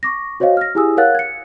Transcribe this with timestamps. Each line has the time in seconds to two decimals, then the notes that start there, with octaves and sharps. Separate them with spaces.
0.03 C#6 D6 A#6
0.40 F#4 C5 C#5 D#5 F5
0.57 F6 A#6
0.75 E4 G4 G#4 G#5 D#6 E6
0.97 A#4 C#5 F5 F#5 F#6 A6
1.15 G#6 C#7